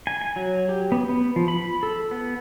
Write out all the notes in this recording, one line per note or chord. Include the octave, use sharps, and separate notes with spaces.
G#5
G#5
F#3
G4
B3
B3
F3
B5
A4
B3